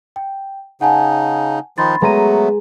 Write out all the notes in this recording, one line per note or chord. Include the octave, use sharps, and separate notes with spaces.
G5
C#3 D#4 F#5 G#5 A5
D#3 F3 D#4 B5 C6 A6
F#3 G#3 A3 B3 B4 A#5 D#7